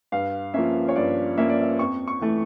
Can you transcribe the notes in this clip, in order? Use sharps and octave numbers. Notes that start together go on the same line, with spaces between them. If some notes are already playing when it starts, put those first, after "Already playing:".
G2 F5
F3 A#3 C#4 E5
C#5
G2 D5
F3 A#3 C#4 E5
D5
E5
F2 C#6
C#6
E3 A3